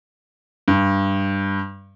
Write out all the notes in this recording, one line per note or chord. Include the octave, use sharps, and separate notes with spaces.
G2